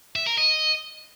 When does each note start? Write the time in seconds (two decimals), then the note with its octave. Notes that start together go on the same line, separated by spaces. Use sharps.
0.16 E5
0.27 A#4
0.38 D#5